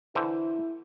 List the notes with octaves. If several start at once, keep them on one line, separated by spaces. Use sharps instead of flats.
D3 E3 E4 C5